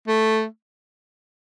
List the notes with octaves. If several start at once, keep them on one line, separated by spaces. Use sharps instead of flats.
A3